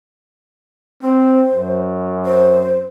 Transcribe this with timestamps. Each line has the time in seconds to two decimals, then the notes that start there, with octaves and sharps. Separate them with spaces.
1.02 C4 C5
1.54 F#2
2.25 C5